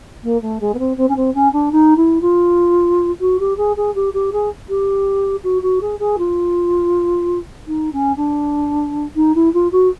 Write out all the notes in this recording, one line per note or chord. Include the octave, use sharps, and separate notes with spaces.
A#3
A3
G#3
B3
C4
C4
C#4
C4
C#4
D4
D#4
E4
F4
F#4
G4
G#4
G#4
G4
G4
G#4
G4
F#4
F#4
G#4
G#4
F4
D#4
C#4
D4
D#4
E4
F4
F#4